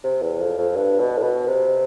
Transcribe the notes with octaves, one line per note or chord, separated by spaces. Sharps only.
C3
E2
F2
F2
G2
B2
A2
B2
C3